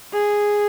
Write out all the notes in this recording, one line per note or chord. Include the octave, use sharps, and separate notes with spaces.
G#4